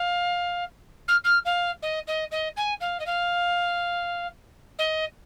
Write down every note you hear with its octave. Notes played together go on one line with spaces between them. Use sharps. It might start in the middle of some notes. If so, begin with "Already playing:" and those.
Already playing: F5
F6
F6
F5
D#5
D#5
D#5
G#5
F5
D#5
F5
D#5